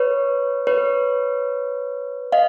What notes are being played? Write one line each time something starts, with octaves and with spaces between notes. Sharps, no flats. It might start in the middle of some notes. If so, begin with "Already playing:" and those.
Already playing: B4 C#5
B4 C#5
D#5 F5